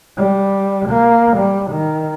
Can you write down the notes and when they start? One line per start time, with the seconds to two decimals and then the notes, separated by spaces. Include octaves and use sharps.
0.17 G3
0.89 A#3
1.37 G3
1.71 D#3